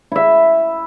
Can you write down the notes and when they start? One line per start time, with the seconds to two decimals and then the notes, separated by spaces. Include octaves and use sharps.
0.12 E4 E5